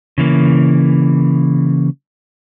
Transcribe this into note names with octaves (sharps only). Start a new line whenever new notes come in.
C#3 E3 A#3